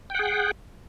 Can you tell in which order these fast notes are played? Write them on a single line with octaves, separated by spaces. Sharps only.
G5 F#5 G#4